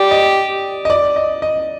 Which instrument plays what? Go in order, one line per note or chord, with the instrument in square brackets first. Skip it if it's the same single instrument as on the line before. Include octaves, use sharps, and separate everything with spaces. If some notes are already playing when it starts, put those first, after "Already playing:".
Already playing: [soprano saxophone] G4 [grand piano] D5
[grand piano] D#5
D#5
D5
D#5
D#5